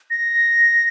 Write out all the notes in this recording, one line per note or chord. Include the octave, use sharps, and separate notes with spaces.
A#6